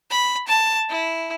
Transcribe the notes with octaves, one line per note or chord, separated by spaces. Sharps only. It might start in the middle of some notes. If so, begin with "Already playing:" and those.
B5
A5
E4